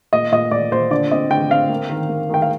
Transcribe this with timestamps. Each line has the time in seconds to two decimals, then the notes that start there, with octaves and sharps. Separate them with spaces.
0.13 A#2 D#5
0.32 A#2 D#5
0.51 A#2 D5
0.71 A#2 C5
0.91 D3 D5
1.11 C4 D#5
1.31 D3 G5
1.50 C4 F5
1.70 A#3
1.90 D#3
2.09 A#3
2.30 D#3 G5
2.42 F5